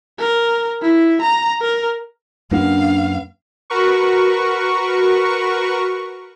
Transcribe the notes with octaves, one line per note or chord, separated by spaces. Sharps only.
A#4
E4
A#5
A#4
F#2 A#3 C#4 D4 B4 F5 F#5
F#4 A#4 B4 C#6